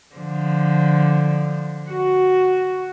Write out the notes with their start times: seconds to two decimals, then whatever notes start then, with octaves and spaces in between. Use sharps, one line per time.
0.15 D3 F3
1.89 F#4